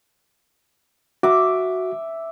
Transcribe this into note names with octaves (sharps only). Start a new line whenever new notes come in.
F#4 E5 D6